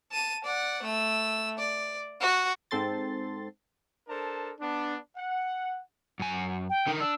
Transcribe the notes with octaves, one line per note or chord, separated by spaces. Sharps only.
A5 D#7
D5 F#5
A3 E6
D5
F#4
G#2 C4 A4 C6 A6
D4 A4 A#4 C5 A5
B3 D4
F#5
F#2 G#5
G5
D3 D#4 A#4
D4 E6